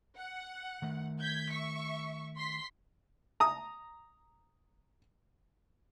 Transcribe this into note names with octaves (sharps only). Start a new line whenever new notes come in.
F#5
D#3 A3
G6 G#6 B6
E5 C#6
C6 B6 C7
A#5 D#6